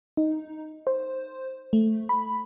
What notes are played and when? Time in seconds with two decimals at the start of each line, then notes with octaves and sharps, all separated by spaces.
0.17 D#4
0.87 C5
1.73 A3
2.09 B5